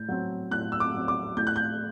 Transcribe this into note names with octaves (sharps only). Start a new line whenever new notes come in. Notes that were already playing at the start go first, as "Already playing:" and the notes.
Already playing: A2 G6
F#3 C4
A2 F#6
E6
D6
F#3 C4
D6
A2 G6
F#6
G6